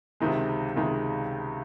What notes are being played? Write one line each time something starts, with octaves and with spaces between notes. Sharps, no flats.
C#2 C3 D#3 G#3
C#2 C3 D#3 G#3